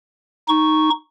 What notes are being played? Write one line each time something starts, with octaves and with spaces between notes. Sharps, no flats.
D#4 C#6